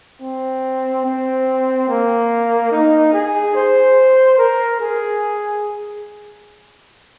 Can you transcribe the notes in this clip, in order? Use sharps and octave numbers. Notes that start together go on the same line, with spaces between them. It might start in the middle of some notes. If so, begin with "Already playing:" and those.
C4
C4
A#3
D#4
G#4
C5
A#4
G#4